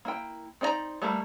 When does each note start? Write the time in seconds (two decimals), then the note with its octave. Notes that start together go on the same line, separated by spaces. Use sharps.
0.05 A#3 E4 G5
0.61 C4 D#4 D5 D#5 A#5
1.02 G3 A3 A#3